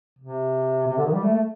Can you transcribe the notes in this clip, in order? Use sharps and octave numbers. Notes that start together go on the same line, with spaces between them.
C3
C3
D3
D#3
G3
A3
A3